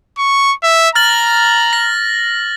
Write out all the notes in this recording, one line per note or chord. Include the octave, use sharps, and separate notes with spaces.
C#6
E5
A#5 F6 A6 F#7
A#6